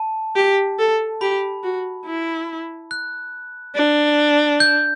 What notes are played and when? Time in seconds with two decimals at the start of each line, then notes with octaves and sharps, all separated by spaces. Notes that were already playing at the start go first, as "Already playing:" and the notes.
Already playing: A5
0.36 G4
0.79 A4
1.21 G4 B5
1.63 F#4
2.06 E4
2.91 F#6
3.75 D4
4.60 G6